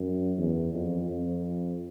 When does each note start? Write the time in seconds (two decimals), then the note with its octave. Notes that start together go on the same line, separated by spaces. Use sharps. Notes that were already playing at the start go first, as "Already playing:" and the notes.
Already playing: F#2
0.38 E2
0.74 F2
1.10 F2